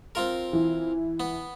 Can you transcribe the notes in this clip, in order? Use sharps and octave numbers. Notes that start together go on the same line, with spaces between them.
C4 F4 A#4
E3
B3